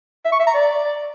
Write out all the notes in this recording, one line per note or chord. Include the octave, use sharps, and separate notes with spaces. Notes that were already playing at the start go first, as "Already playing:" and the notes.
E5
C#6
E5
A#5
D5